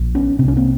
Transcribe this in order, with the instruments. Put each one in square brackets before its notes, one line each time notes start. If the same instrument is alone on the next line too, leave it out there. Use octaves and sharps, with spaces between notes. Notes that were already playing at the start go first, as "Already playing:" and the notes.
Already playing: [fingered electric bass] A#1
B3 C#4
C3 C4
C2 C#4
A#3 C4